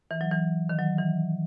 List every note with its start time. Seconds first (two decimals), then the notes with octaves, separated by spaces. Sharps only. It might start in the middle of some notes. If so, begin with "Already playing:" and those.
0.11 E3
0.21 F#3
0.31 E3
0.69 D#3
0.79 F#3
0.98 E3